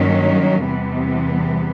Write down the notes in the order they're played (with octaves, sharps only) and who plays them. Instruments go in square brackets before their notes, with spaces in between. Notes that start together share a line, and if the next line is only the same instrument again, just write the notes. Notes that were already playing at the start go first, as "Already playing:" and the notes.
Already playing: [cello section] G2 D#3 F#3 A#3 C#4
E2 C3 E3 G3 B3